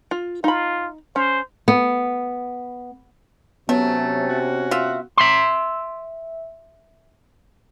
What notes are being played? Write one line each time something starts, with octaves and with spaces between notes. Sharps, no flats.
F4
D#4 F4 B5
C#4 C5
B3
C3 F#3 A3 B3 C#4
F#4
F4 E5
E5 C6